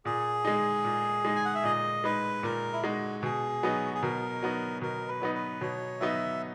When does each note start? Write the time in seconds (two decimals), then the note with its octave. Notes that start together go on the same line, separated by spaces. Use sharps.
0.05 A#2 G#4
0.45 G#3 D#4
0.85 A#2
1.25 G#3 D#4
1.36 G#5
1.45 F#5
1.55 E5
1.64 A#2 D#5
2.04 G#3 D#4 B4
2.43 A#2 A#4
2.73 E4
2.83 G#3 D#4 F#4
3.23 B2 G#4
3.63 F#3 B3 D#4
3.85 F#4
3.94 G#4
4.02 B2 A#4
4.42 F#3 B3 D#4
4.81 B2 A#4
5.08 B4
5.21 F#3 B3 D#4
5.35 B4
5.61 B2 C#5
6.00 F#3 B3 D#4 E5